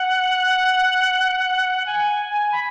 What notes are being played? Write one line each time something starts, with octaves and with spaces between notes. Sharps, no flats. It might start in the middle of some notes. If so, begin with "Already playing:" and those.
Already playing: F#5
G#5
B5